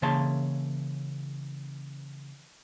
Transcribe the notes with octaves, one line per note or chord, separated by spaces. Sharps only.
C#3 E3 A#3 C#5 A5 C6